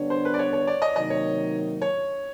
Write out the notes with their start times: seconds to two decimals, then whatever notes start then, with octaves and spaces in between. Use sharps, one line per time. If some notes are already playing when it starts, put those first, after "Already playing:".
Already playing: D3 G3 B3 D4 C#5
0.10 C5
0.25 B4
0.34 D5
0.39 C#5
0.53 C#5
0.67 D5
0.82 D#5
0.96 C3 D#3 F#3 A#3 D#4 D#5
1.10 C#5
1.82 C#5